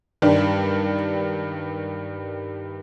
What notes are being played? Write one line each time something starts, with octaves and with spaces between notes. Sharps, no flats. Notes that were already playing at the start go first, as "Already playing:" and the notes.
G2 D#3 G3 D4 G4